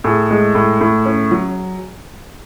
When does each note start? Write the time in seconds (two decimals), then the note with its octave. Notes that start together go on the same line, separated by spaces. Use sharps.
0.04 A2 G#4
0.31 G#3
0.55 A2
0.81 A2
1.06 C#4
1.31 F#3